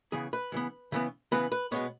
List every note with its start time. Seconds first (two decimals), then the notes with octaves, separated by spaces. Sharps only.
0.12 C#3 E3 B3 G#4
0.33 B4
0.52 C#3 E3 B3
0.92 C#3 E3 B3
1.32 C#3 E3 B3 B4
1.52 B4
1.72 B2 G#3 B3 C#5